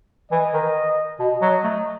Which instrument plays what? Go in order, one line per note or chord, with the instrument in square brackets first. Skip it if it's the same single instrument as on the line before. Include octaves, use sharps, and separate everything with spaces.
[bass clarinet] E3 [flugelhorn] D#5
[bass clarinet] D#3
[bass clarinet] B2 [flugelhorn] D#5
[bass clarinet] F#3
A3